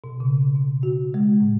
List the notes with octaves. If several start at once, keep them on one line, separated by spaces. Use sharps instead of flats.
B2
C#3
B2
F#4
G#3
A2